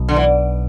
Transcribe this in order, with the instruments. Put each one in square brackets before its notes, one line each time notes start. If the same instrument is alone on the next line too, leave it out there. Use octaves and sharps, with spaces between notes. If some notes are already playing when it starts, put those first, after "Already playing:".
Already playing: [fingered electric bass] B1 B2
[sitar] D3
E3